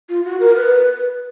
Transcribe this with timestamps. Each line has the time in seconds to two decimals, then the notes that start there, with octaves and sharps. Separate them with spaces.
0.09 F4
0.25 F#4
0.40 A#4
0.56 B4